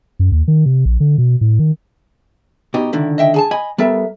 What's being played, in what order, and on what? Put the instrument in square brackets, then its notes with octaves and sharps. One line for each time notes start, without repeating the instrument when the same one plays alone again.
[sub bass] F#2
D#2
D#3
C3
A#1
D3
B2
A2
D#3
[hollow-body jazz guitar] B2 D#4 G4
[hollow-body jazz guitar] C#2 D3 D#3 [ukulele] E4
[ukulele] D#5 E5 G5
G#4 G#5 A5
[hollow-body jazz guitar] D#5 G#5 [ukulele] B5
[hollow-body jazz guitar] G3 B3 A4 [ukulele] A#4 E5